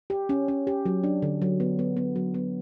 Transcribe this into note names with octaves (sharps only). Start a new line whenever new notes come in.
G4
C#4
C#4
G4
F#3
D4
D3
F#3
B3
B3
B3
F#3
B3